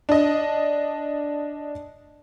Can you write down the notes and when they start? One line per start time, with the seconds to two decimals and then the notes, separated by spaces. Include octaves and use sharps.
0.09 D4 D#5